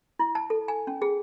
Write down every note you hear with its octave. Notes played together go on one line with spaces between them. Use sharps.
E4
A5
A4
G#5
C#4
G#4